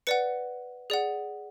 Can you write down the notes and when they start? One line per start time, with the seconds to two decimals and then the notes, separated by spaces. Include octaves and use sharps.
0.07 B4 D5 F#5 C#7
0.90 G#4 D5 F#5